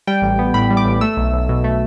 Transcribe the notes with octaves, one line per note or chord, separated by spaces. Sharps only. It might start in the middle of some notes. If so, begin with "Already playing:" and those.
G3 G5
A1
B3
A2 B5
G3
D6
A1
A3 E6
B1
B1
B2
A3